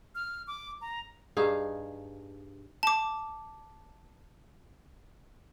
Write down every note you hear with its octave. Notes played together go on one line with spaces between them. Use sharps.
F6
D6
A#5
G2 D#4 G#4 F5
A5 D6